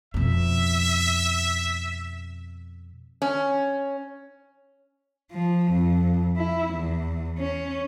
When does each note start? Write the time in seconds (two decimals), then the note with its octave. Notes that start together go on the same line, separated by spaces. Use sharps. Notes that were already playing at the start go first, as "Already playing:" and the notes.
0.14 F2 B2 E5
3.22 C#4
5.32 F3
5.72 F2
6.37 E4
6.74 E2
7.39 C#4